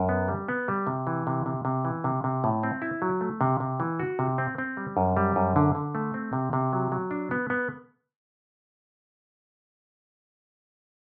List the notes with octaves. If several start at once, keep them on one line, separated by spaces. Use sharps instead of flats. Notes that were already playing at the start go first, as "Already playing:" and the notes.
Already playing: F#2
B3
G3
B3
G3
C3
E3
C3
C3
C3
E3
C3
C3
A2
C4
E4
F#3
A3
C3
C3
E3
F#4
C3
C4
C4
G3
F#2
G3
F#2
D3
D3
A3
C4
C3
C3
F#3
F#3
D4
B3
B3